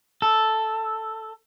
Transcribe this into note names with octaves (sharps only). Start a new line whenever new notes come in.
A4